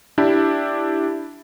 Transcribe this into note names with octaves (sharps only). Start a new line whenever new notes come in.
D4 E4 G4